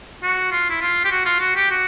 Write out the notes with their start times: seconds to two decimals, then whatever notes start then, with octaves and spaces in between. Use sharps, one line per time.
0.23 F#4
0.52 F4
0.70 E4
0.81 F4
1.04 G4
1.11 F#4
1.26 F4
1.40 F#4
1.56 G4
1.71 F#4